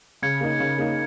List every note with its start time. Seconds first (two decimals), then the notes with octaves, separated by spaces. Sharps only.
0.22 C#3 G#6 C#7
0.41 A#3 D#4
0.60 C#3
0.78 A#3 D#4